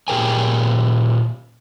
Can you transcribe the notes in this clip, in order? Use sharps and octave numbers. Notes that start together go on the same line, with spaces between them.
A#2 G4 G#4 A#4 G5 G#5